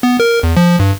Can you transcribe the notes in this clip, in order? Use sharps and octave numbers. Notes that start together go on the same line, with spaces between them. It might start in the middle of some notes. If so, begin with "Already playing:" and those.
B3
A#4
E2
F3
G2